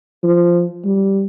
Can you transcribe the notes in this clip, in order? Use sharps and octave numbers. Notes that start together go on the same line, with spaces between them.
F3
G3